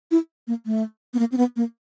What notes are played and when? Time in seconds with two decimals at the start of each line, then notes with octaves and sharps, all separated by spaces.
0.11 E4
0.47 A#3
0.66 A3
1.14 B3
1.19 A#3
1.32 C4
1.37 B3
1.56 A#3